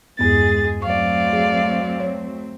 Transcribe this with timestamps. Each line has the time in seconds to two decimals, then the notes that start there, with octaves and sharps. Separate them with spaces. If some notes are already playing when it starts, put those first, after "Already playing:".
0.19 E2 G2 G#3 B3 G#4 A6
0.82 F#3 A3 C4 D5 F5 C#6
1.33 G#4
2.00 C#5